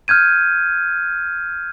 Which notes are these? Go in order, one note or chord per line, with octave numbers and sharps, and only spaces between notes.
F6 G6 G#6 D#7